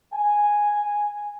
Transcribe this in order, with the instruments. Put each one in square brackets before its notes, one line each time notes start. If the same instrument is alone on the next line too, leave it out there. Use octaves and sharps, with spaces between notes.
[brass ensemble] G#5